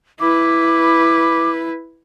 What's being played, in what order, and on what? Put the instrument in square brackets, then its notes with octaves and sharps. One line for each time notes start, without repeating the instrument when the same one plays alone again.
[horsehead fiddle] E4 B4 [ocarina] D6